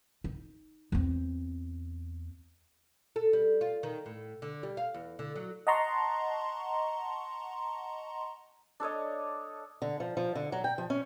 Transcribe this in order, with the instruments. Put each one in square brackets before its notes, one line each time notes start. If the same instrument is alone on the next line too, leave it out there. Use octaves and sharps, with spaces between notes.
[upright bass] D#4
E2 C4
[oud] A4
G3
F4
D#3
A2
D3
G3
F5
E2
D3
F#3
[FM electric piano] D#5 F#5 A5 A#5 C6 C#6
[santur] D4 A4 C#5 D#5
[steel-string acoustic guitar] D3
F3
F3
D3
F#3
G5
F3
C#4